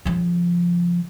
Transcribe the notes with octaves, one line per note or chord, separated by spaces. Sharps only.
C#3 F3